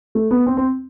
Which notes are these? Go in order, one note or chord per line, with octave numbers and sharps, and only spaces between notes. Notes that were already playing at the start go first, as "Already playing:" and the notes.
A3
B3
C4
C4